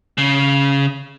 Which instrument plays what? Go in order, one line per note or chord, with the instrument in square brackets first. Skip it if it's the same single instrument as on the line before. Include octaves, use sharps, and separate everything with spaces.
[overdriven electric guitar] C#3